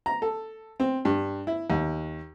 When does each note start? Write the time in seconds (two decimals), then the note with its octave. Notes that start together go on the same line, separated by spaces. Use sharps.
0.06 A#5
0.22 A4
0.80 C4
1.05 G2
1.47 E4
1.70 D#2